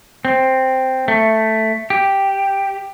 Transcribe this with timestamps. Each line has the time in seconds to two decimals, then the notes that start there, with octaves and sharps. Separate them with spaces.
0.25 C4
1.08 A3
1.90 G4